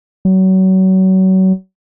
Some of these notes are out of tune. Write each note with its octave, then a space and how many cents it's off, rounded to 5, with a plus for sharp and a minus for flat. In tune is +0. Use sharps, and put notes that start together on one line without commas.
F#3 +30